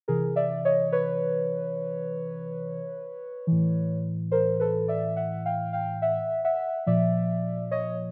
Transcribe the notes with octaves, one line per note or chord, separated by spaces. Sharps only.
C3 E3 G#4 A#4
D5 E5
C#5 D#5
B4 C#5
A2 E3
A#4 C5
A4 B4
D5 E5
E5 F#5
F5 G5
F5 G5
E5 F#5
E5 F#5
A#2 F3 D5 E5
C#5 D#5